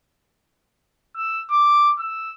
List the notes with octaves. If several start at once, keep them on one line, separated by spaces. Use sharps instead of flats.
E6
D6
E6